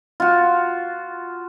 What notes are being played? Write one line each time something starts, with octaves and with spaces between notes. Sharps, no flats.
F4 F#4